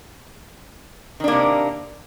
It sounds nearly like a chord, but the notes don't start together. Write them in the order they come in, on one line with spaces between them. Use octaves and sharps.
D#3 D4 A#3 C3